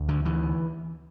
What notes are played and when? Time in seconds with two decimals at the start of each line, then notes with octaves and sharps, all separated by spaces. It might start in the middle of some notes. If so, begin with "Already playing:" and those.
Already playing: D2
0.09 D3
0.25 E3